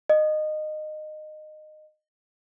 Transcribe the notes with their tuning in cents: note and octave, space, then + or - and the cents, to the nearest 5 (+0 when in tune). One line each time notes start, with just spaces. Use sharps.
D#5 -20